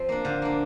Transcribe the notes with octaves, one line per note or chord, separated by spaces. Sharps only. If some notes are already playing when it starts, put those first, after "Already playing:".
Already playing: F3 C4
A#3 D4
D3 C5 F5
A#3 D4